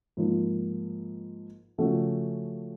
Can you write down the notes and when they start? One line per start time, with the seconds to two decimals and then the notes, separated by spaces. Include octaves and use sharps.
0.17 G#2 F3 A#3
1.78 C#3 F3 A3 C#4 F#4